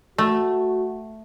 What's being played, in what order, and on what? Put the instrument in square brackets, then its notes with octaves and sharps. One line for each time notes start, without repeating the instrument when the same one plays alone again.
[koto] A3 [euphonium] F#4